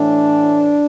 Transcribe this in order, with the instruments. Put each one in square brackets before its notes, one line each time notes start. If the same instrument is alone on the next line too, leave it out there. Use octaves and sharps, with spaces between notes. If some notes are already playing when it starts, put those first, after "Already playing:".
Already playing: [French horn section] A2 E3 D4